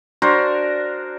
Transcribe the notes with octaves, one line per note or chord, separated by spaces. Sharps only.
D4 F#4 A#4 C5